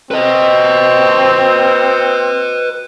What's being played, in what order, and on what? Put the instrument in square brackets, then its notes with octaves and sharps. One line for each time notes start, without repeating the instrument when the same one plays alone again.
[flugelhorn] C4 [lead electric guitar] B4 D#5